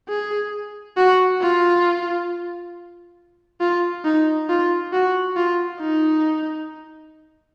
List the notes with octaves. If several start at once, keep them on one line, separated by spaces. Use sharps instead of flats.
G#4
F#4
F4
F4
D#4
F4
F#4
F4
D#4